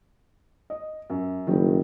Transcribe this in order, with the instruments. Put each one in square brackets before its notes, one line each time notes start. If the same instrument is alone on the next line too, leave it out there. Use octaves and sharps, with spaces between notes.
[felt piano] D#5
F#2
[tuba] F#1 [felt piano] G2 D#3